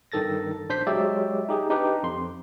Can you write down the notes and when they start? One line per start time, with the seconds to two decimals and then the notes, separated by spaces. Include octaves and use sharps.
0.12 G2 D#3 A4 A6 A#6
0.69 A#1 D4 C5 G6 B6 C7
0.87 F#3 G#3 G4 D5 E5
1.49 D#4 G4 G#4
1.70 D4 D#4 G4 B4
2.03 F2 C6